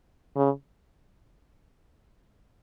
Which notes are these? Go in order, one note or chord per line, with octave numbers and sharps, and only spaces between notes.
C#3